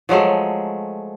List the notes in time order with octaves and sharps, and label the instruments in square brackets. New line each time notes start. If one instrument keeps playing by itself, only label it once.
[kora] F3 F#3 G#3 A3